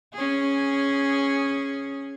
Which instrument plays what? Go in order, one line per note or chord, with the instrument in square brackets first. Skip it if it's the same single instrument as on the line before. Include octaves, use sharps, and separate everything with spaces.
[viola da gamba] C#4 G#4